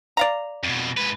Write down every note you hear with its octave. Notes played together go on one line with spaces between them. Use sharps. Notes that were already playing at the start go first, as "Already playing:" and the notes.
D5 F5 A#5
F2 B2
G#2 B4